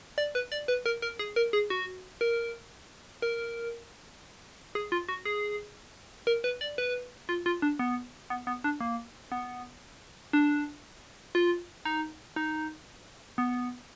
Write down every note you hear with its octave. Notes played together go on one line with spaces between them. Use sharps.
D5
B4
D5
B4
A#4
A#4
G#4
A#4
G#4
F#4
A#4
A#4
G#4
F4
F#4
G#4
A#4
B4
D5
B4
F4
F4
D4
B3
B3
B3
D4
A#3
B3
D4
F4
D#4
D#4
B3